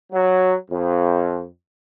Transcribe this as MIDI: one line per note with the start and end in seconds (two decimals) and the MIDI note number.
0.12 0.54 54
0.70 1.45 41